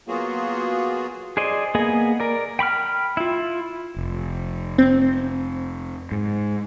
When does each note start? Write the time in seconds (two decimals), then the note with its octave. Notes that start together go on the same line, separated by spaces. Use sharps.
0.08 F#3 A#3 B3 F4 F#4 G#4
1.37 G#4 C5 D5 D#5
1.75 A#3 B3 G#4 D#5 G#5
2.20 A#4 D5
2.59 G5 B5 C#6 F6
3.17 E4 F4
3.96 F1
4.78 C4
6.12 G#2